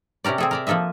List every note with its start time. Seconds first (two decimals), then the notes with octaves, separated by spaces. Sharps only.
0.24 C3 C#4 G4 A#4 D5
0.38 C4 G#4 A4
0.51 A#4 D5 E5
0.67 F3 A#3 A4 D#5 E5